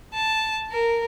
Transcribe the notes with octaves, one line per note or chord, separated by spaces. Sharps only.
A5
A#4